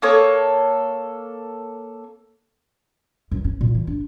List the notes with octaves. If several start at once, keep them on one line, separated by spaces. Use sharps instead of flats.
A#3 A4 C#5 D#6
F#2 E3
C#4
A#2
E3
D4